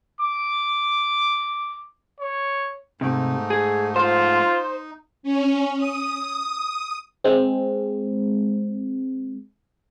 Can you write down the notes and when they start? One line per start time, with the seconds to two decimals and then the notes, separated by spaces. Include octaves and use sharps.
0.21 D6
2.20 C#5
3.01 G#2 C3 A3 D#4
3.50 G#4
3.96 F4 C5
4.45 D#4
5.23 C#4
5.77 D#6
7.24 G#3 C4